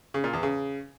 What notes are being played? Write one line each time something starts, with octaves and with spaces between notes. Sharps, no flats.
C#3
A#2
E2
C#3